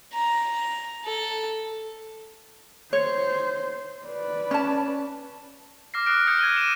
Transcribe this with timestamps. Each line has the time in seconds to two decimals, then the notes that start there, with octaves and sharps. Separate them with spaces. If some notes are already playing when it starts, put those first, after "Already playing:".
0.13 A#5
1.05 A4
2.93 C5 C#5
4.06 B4 D5
4.51 C#4 A5
5.94 D6 F6 A#6 C7
6.06 D#6 F6 F#6 D7
6.27 D#6 F6 G6 C#7
6.39 G#6 D#7 G7
6.57 D#7 E7